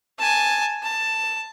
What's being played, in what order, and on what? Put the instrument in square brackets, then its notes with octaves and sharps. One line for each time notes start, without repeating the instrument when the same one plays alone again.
[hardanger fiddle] G#5 A5
A5